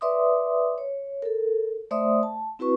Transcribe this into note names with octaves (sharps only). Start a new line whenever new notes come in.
B4 D5 E5 C6 D6 D#6
C#5
A4 A#4
A3 C5 D5 E5 C6 D#6
A5
C4 E4 F#4 B4 C#6